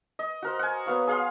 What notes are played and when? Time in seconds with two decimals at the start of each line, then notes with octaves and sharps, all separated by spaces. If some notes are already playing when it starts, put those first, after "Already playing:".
0.19 D#5
0.42 F#4 A#4 C5
0.59 F#5 G#5
0.86 F#3 B3 F5 C#6
1.07 G#4 F5 C6